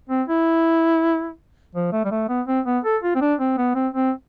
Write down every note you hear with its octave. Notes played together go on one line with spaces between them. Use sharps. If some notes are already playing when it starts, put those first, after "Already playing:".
C4
E4
F3
A3
G3
A3
B3
C4
B3
A4
F4
C4
D4
C4
B3
C4
C4